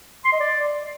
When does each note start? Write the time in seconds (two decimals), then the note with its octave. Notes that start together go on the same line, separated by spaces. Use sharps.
0.25 C6
0.33 D#5
0.40 D5